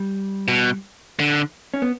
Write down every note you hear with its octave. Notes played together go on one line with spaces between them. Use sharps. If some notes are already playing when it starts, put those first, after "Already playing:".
Already playing: G3
B2
D3
C#4
B3